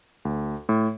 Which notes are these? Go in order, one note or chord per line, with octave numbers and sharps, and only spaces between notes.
D2
A2